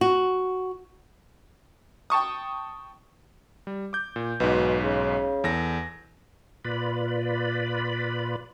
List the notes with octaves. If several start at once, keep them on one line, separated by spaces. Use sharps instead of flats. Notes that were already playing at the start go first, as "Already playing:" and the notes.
F#4
G5 A5 C#6 D#6
G3
D6 G6
A#2
B1 G#2 B2
C#3
E2 A4 A#6
A#2 F4 B4 D5 B5